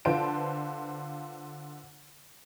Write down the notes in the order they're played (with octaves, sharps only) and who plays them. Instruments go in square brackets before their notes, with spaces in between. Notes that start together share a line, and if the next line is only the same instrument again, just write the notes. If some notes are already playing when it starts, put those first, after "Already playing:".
[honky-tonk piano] D3 F4 B4 C5 A5 D7